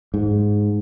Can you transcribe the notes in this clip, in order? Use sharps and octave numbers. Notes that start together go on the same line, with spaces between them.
G#2